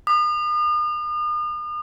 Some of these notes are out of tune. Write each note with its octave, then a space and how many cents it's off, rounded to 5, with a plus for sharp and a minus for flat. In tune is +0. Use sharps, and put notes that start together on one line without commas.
D#6 -40